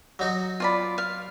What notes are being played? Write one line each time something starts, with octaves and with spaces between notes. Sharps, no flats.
F#3 D#4 F#4
F4 D5 B5
F5